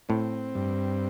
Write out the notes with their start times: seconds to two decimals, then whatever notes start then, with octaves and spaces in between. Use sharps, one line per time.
0.09 A2 C4
0.55 G2